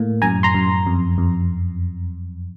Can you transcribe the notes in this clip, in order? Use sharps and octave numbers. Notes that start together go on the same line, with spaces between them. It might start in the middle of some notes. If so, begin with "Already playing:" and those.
Already playing: A2 A#3
F#2 G#5 A#5
A#5 C6
F#2
F2
F2